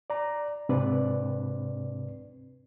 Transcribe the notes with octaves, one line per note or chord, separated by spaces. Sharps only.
D5 A#5
G#2 C3 C4 D4 B4 D5